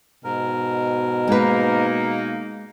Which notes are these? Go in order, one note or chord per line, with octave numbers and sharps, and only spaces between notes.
G#2 B2 A#4
G#3 A#3 D#4 B4